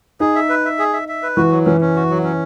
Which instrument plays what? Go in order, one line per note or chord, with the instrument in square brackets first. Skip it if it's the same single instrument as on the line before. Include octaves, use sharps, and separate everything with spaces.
[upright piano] D#4 [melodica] G#4
[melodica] E5
B4
E5
G#4
E5
E5
B4
[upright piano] E3 [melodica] F#4
[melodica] F#3
[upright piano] E3 [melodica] C#4
[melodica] C#4
F#4
F#3
C#4